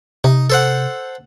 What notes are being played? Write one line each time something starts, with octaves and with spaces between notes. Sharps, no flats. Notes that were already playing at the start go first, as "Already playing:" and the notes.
C3 D#4
A4 C5 F#5